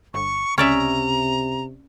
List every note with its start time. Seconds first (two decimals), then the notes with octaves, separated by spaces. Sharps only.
0.14 G1 C#6
0.58 C#2 C3 C#4 D5 E5 A#5